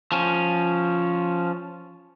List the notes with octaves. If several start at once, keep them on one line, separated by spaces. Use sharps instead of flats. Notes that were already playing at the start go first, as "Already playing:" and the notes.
F3 C#4